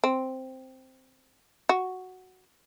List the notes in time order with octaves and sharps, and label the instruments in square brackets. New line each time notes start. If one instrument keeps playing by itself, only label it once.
[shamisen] C4
F#4